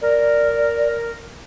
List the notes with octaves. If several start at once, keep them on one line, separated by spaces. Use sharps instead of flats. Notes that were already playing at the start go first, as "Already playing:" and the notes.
A#4 D5